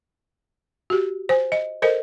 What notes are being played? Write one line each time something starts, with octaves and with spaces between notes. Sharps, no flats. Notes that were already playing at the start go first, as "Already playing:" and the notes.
F#4 G4
C5 G#5
D#5
A4 A#4 C5 D#5